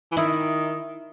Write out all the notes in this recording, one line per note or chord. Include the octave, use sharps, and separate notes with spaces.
E3
D#3 E4